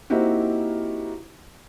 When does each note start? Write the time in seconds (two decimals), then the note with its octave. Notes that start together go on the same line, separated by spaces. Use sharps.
0.10 A#3 C4 D#4 E4 F#4 G4